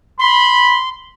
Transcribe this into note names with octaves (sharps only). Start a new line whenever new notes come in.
B5 C6